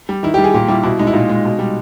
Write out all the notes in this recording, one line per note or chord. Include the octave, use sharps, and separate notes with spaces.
G3
D#3 E4
G3 G4
G#4
A#2 G4
G3 E4
B2 E4
G#3 D#4
E4
A#2 D#4
G#3
B2
G3